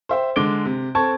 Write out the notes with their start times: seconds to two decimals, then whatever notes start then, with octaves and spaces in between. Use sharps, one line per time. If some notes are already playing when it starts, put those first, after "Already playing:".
0.09 C5 E5 G5
0.36 D3 G#3 D6 D7 G7
0.65 C3
0.95 C4 A4 A5 C#6 G#6